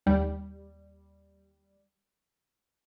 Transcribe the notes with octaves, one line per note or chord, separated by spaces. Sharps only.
D#2 G3